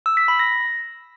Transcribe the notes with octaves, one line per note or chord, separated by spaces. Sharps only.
E6
B6
B5
A#6